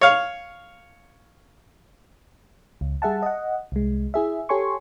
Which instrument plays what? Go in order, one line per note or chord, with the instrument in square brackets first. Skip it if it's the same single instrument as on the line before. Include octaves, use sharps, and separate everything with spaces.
[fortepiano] C#5 F5
[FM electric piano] C#2
G3 G#4 E5 F#5 A5
D#5 F#5
C2 G#3
E4 G#4 E5
G4 A4 C#5 G#5 C6 C#6